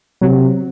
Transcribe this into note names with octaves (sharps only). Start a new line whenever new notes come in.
C3 F#3